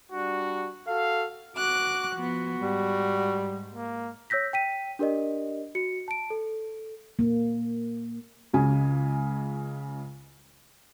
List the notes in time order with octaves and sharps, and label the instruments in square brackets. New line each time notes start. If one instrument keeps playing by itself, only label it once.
[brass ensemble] G3 D4 F#4
F#4 A4 F5
[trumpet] F#4 [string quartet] D6 F#6
[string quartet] F3 B3
[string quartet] G#2 [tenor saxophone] G3
[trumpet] A#3
[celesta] C#5 E6 G6 A#6 B6
G5 B6 D#7
D4 G4 A#4 D5 D#5
F#4 C#7
A5 D7
A4
[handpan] A#3
[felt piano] C#2 C#3 G#5